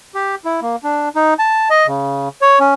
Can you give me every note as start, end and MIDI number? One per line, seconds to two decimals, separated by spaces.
0.15 0.35 67
0.45 0.60 64
0.62 0.76 58
0.84 1.09 62
1.16 1.34 63
1.39 1.69 81
1.70 1.87 75
1.87 2.29 49
2.41 2.59 73
2.60 2.74 61